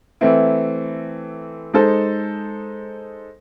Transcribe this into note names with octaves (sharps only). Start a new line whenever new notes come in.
E3 A3 C4 E4
G#3 D#4 A4 C5